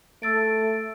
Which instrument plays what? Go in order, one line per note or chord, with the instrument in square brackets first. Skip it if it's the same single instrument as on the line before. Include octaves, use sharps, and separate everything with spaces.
[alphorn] A3 [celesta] E6 A6 D7